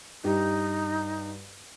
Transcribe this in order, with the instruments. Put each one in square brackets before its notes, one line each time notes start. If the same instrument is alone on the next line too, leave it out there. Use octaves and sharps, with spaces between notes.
[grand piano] G2 G4 [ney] D#4